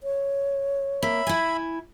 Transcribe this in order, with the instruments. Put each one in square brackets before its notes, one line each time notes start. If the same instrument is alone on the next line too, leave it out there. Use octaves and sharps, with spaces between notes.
[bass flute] C#5
[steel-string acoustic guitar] A#3 [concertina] E5 B5
[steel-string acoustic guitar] E4 G#5